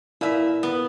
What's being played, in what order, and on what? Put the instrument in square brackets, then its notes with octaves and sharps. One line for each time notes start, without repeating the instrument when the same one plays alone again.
[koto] A#2 E5 [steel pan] E4 F5
[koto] B3